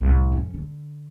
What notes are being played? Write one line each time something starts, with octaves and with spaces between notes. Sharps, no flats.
C2 A2
F2 C#4
D3